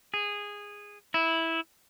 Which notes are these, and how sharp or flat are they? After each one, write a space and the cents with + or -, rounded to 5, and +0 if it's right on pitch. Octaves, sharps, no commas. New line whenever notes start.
G#4 -15
E4 -10